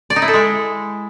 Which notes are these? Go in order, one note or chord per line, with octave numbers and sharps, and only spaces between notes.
D5
D#4
E4
A4
G#3